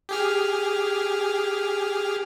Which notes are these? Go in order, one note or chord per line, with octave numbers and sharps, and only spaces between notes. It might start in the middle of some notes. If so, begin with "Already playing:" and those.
G4 G#4 F6